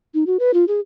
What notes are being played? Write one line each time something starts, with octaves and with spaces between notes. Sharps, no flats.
D#4
F#4
B4
F4
G#4